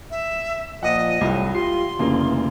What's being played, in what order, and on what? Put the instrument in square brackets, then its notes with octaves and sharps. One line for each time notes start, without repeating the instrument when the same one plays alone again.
[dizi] E5
[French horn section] A#2 F3 [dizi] D#5 [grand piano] F#5 D#6
[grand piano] C2 F#3 F4 [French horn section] A2 C3
[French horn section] F4 G4 [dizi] C6 [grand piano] C7
[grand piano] F1 C#3 A#3 [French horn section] D2 E3